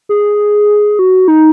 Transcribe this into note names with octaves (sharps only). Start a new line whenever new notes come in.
G#4
F#4
D#4